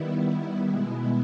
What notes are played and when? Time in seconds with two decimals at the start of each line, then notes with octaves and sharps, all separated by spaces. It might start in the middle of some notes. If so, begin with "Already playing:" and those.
Already playing: D#3 G3 B3 E4
0.70 B2 G#3 B3 E4